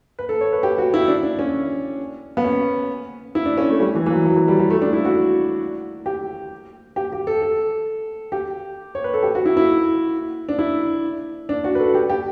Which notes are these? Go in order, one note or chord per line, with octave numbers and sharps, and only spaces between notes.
B4
A4
C#5
B4
G4
F#4
E4
D4
D4
C#4
B3
C#4
E4
D4
C#4
A3
G3
E3
E3
F#3
F#3
E3
G3
G3
A3
D4
E4
F#4
G4
G4
G4
A4
A4
G4
C#5
B4
A4
G4
F#4
E4
E4
D4
E4
D4
F#4
B4
A4
G4
G4